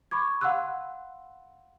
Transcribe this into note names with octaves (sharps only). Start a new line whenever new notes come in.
B5 C#6 D6 G#6
F5 F#5 B5 C6 E6 F#6